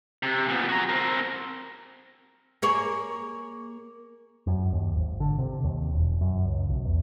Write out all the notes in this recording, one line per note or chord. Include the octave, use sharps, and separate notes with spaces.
C3
A#2 B3
F#4 A#5
C4 A#4
A#3 G#4 C#5
F#2
D#2
G#1
D3
C3
D#2
E1
F#2
C#2
B1
E2